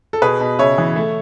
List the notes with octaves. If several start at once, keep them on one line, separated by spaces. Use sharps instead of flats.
A4
B2 G#4 B4
B2
C#3 C#5 E5
E3
A3